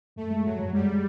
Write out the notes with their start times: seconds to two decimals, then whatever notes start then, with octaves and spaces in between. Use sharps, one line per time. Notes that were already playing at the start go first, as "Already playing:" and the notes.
0.16 F#2 A3
0.30 G#3
0.45 F#2 F#3
0.60 F#2
0.73 G3 G#3
0.87 G#3